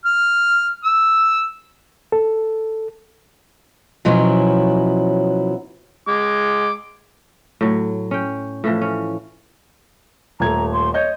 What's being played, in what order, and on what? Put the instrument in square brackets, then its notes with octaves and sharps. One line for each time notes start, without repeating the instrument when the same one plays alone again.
[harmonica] F6
E6
[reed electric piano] A4
[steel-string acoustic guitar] B2 F3 F#3 B3 C#4 E4
[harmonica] G#3 D6
[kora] A2 F#3
C#4 G5
A2 E3 F3
C#4
[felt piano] D#1 A3 G#6 [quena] A#5
[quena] C6
[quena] C#5 [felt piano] D#5 G6